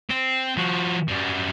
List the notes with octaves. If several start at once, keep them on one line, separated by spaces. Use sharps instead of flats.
C4
F3 F#4
F#2 G3